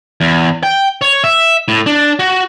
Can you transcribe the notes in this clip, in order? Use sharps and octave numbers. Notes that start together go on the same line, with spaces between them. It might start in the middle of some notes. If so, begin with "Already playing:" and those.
E2
G5
C#5
E5
A2
D4
F#4